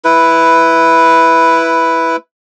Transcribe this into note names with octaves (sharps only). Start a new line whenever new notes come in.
E4 B4